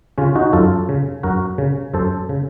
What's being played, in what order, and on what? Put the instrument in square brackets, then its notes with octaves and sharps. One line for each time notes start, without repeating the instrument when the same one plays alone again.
[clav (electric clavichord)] C#3 C#4 F4
D#4 F#4
F#2 F4 A4
C#3
F#2 F#4 A#4
C#3
F#2 A4 C5
C#3